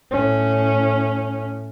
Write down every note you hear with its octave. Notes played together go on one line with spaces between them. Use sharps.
A2 C#4